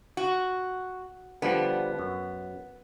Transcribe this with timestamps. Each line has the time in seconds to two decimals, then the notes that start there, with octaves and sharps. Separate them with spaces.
0.17 F#4
1.42 D3 F3 G3 B3
1.99 F#2